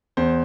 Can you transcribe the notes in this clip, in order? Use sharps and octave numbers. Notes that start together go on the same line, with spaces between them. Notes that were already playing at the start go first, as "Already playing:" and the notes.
E2 C5